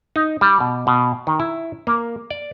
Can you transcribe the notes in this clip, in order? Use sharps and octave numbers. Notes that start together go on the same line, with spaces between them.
D#4
G3
B2
B2
D#3
E4
A#3
D5